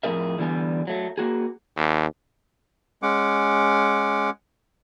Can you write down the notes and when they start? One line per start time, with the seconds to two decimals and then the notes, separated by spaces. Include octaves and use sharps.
0.03 F2 A2 A#3 G#4 A#4 E5
0.38 D3 E3 G3 B3 G#5
0.87 F#3 A3
1.18 A#3 F#4 G#4
1.76 D#2
3.03 G#3 C#4 F#5 D6